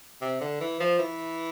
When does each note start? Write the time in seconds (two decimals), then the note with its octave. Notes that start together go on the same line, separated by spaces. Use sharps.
0.21 C3
0.41 D3
0.61 E3
0.80 F3
0.99 E3